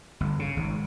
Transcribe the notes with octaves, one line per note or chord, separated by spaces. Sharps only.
G1
C#3
G#1